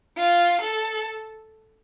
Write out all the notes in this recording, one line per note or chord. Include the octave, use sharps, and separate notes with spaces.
F4
A4